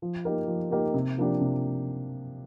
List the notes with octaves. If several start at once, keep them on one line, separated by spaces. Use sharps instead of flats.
F3
A#3 D#4 G4 A#4
F3
A#3 D#4 G4 A#4
C3
F3 A#3 D4 G4
C3